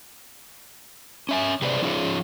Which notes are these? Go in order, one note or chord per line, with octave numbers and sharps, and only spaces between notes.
C#4 E5 G#5
C3 G#4 B4 C5 D5
F3 C#4 D#4 F4 G#4 C#5